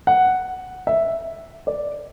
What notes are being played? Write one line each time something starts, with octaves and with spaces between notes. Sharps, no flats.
F#5
E5
D5